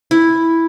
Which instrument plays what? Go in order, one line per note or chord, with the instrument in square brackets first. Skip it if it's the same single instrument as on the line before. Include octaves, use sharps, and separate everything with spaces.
[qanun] E4